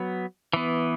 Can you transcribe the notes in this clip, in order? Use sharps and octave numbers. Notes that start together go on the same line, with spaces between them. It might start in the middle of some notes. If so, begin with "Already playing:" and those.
Already playing: F#3 B3
E3 B3